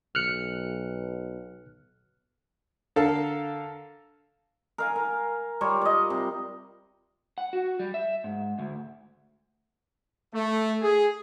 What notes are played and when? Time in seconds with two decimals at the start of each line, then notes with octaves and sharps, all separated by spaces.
0.15 B1 F6 F#6 C#7
2.96 D3 A4 A#4 F5 A5
4.78 A#4 F5 G#5
4.96 A#4
5.61 G3 F4 A#4 C#5
5.81 D5 D#5
6.10 C3
7.38 F#5
7.53 F#4
7.80 G3
7.94 E5
8.24 G#2
8.59 D2
10.35 A3
10.82 G#4